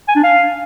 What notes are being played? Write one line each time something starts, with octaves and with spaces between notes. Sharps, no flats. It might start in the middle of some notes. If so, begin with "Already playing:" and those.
G#5
D4
F5